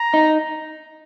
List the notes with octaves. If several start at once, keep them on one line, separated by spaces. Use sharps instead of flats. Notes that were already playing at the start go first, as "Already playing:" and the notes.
Already playing: A#5
D#4